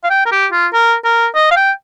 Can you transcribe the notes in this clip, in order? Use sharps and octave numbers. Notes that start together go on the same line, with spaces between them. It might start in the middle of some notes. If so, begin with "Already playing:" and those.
F5
G5
A#4
G4
F4
A#4
A#4
D#5
F5
G5